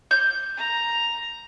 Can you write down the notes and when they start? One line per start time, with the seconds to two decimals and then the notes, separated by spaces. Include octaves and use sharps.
0.11 G6
0.57 A#5